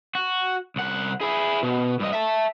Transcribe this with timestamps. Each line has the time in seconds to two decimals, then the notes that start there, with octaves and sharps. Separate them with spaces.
0.15 F#4
0.76 C2 F#5
1.21 E4 G#4
1.63 B2
2.00 G2 D#5
2.12 E5 A5